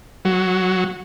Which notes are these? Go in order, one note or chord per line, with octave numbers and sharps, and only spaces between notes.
F#3